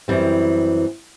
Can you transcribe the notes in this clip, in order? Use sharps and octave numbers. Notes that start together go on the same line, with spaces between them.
F#2 E3 G3 C4